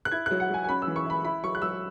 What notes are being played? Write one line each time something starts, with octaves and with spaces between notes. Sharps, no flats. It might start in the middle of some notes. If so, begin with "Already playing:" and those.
F#6
E4 G#6
F#3 F#6
F#5
F#3 G#5
G#5
C#4 B5
E6
E3
C#6
E4 B5
E4 B5
F#3 C#6
F#6
F#3 E6